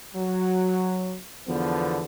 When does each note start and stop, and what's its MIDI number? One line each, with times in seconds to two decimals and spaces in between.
0.16 1.17 54
1.48 2.05 40
1.48 2.05 50
1.48 2.05 53
1.48 2.05 59